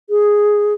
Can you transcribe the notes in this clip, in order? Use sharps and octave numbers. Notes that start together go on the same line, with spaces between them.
G#4